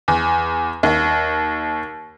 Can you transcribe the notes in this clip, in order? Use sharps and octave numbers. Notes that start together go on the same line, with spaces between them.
E2
D#2